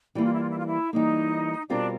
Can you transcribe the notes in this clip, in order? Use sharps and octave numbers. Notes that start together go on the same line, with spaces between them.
E3 G3 A#3 E4
F4
E4
F4
E4
F4
E4
E3 G3 A#3 D#4
B2 G3 C4 D4 F4 A#4